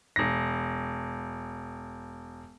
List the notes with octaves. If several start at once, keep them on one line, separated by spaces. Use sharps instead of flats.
E1 A#6